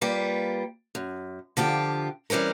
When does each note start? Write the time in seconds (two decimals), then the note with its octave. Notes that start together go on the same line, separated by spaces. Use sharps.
0.01 G3 A#3 F4 B4
0.95 F#2
1.57 D3 F3 F4 G4
2.30 E3 G3 C4 C#4 A#4